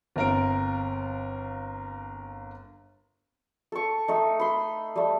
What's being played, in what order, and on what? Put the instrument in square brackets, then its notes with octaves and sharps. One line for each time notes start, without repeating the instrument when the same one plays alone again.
[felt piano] G1 C4 A#4 F5 D7
[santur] A4 C#6
A3 D#4
B5 C6
G3 A3